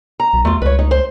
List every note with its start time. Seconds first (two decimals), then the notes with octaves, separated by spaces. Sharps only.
0.20 A#5
0.33 B1
0.45 E2 A3 F4
0.62 C#2 B4 C#5
0.79 D#4
0.91 C5